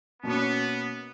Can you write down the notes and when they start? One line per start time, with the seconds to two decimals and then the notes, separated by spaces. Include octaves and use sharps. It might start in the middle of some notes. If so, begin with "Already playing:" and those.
0.23 B2 A#3 B3 C#4